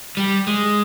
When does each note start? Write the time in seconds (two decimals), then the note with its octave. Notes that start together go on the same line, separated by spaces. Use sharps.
0.17 G3
0.47 G#3